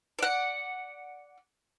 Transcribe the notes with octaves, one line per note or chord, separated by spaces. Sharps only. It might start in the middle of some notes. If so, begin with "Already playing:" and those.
D5 F#5